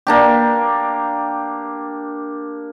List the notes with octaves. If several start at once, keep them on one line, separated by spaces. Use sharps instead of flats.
A#3 D4 G4